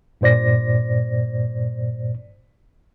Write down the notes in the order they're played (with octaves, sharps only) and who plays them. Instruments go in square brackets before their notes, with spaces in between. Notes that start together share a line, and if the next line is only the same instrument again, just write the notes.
[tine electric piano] G2 A#2 C5 D5 A#6